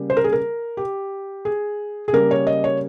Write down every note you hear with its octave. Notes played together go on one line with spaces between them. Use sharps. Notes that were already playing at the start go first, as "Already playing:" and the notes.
Already playing: C#3 G3 A#3
C5
A#4
G#4
A#4
G4
G#4
G#4
C#3 G3 A#3 A#4
C#5
D#5
C#5